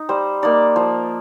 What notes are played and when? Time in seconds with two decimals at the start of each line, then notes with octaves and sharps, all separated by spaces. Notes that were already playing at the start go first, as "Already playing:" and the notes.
Already playing: D#4
0.09 G3 C5
0.42 A#3 D#4 D5
0.76 F3